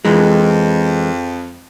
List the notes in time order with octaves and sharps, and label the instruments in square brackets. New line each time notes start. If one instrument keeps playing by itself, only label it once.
[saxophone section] F2 [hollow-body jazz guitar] E3 G#3